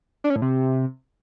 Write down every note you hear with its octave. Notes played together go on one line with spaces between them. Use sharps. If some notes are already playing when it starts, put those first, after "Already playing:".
D4
C#4
A2
C3